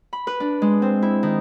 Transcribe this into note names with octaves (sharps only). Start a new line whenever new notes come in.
B5
B4
D4
G#3
C4
E4
D#3